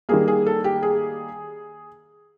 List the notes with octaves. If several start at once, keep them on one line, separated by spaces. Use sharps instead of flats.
D#3 G3 A#3 G#4
G#4
A4
G4
G#4